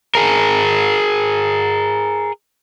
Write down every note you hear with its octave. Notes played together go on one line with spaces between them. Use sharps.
G#4 A#4